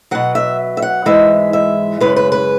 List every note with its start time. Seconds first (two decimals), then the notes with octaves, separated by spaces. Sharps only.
0.11 B2 F#3 F#5
0.35 E5
0.77 E5
0.82 F#5
1.05 G#2 E3 G#3 E5
1.53 E5
2.00 F#2 C#3 G#3 B4
2.16 B4
2.32 B4